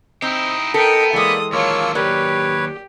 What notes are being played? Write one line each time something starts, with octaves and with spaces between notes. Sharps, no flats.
C4 D#4 E4 G4 D#5
B3 A4 A#4 G5
E3 G#3 A#3 A4 D5 D#6
D#2 F#3 A#3 F4 C#5 A5 E6
G4 A#4 B4 C#5 D5